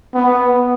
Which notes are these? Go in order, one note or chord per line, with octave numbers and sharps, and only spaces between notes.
B3